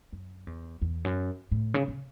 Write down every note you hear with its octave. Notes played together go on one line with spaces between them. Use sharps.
F#2
E2
E2
F#2
A2
C#3
C#3